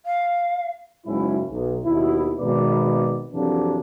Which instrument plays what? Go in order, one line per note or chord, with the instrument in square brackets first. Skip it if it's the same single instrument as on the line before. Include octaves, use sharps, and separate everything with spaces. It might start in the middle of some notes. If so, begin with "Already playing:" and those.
[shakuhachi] F5
[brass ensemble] F#1 G#2 F#3 C#4 E4
B1
D#2 B2 E4
G#1 B2 B3 A#4 B4 D5
F2 C3 E3 F#3 A#3 D4